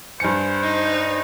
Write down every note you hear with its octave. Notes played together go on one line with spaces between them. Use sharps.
G2 C5 G#5 C#7
D#4